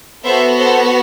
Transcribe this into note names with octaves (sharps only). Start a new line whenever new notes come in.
B3 F#4 A4 C5 E5
A4 C5